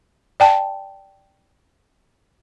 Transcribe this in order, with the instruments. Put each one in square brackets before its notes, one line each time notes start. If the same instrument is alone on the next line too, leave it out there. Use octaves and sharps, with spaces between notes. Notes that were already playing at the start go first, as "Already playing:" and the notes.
[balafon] D5 G5 A5